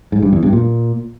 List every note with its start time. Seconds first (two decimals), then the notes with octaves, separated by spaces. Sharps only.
0.12 G#2
0.22 G2
0.32 E2
0.43 G2
0.53 A#2